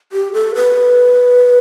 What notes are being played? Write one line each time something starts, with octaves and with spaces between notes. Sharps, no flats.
G4
A4
B4